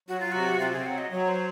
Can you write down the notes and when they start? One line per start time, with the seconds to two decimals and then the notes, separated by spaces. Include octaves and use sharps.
0.08 F#3 F#4
0.20 F4
0.32 C3 F#4
0.60 C4 F4
0.68 F#4
0.73 G#4
0.79 F5
0.86 F#3 F#5
0.98 D#5
1.11 F#3 C#5
1.28 C5